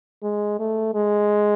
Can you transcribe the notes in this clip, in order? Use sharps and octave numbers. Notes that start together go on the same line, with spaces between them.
G#3
A3
G#3